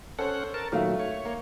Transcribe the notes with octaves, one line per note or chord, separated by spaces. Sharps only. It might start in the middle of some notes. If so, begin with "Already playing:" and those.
C#4 A4 C5 C#5 F#5
A#4 A5
A#2 D#3 F#3 A3 E5 F5 F6
C#5
A#3